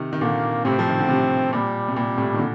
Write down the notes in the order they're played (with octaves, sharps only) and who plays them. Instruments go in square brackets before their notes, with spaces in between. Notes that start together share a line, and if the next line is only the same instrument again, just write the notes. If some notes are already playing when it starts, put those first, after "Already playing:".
Already playing: [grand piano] C3 D#3
D#3
[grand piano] A#2 D3 [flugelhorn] A#3
[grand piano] A2 C3 [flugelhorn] C4
[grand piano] F3
D#3
D3
A2 C3
[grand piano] A#2 [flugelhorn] G3
[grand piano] C3
[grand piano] A#2 [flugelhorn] G3
[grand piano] A2 C3
D#3
A#2 D3